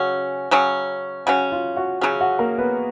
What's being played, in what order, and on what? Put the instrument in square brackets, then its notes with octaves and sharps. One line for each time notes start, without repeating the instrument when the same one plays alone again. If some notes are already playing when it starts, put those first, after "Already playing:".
Already playing: [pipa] C#3 F#3 C#4 [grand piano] F#4 F#5
[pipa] C#3 F#3 C#4
[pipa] C#3 F#3 C#4 [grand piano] F#4 F#5
[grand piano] F4 F5
F#4 F#5
[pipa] C#3 F#3 C#4 [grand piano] G#4 G#5
[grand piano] F#4 F#5
A#3 A#4
B3 B4